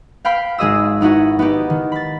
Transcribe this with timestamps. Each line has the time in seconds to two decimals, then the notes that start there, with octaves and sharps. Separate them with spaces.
0.25 F5 G5 B5 F6
0.58 G#1 G#3 G#4 D#5 D#6 E6
1.01 B3 D#4 E4 F#4 G#4
1.39 B3 D#4 G4
1.70 D#3
1.92 B5 A6